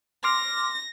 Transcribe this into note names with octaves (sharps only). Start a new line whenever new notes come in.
C6 D6 F6 A#6